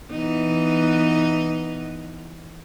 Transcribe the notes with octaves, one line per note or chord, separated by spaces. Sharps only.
E3 B3 D#4